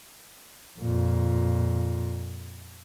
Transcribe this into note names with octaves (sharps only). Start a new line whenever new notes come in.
F2 A#2